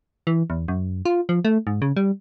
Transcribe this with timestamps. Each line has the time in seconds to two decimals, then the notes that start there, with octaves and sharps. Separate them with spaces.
0.27 E3
0.50 E2
0.68 F#2
1.05 F4
1.29 F3
1.45 A3
1.67 G#2
1.82 C#3
1.97 G3